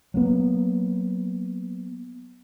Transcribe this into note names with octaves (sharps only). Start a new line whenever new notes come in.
F#3 A#3 B3